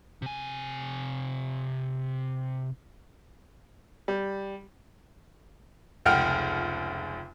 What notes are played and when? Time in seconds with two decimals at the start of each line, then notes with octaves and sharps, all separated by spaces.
0.22 C3 G#5
4.08 G3
6.06 F1 C#2 F#5 G5 F6